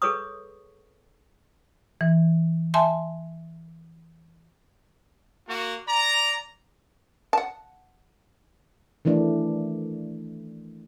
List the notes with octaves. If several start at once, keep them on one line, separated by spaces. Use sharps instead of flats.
G#4 A4 B4 C#5 C#6 D#6
E3
E5 G#5 A5 C6
A#3 F#4
D5 A#5
F#5 A5
D#3 E3 A3 D4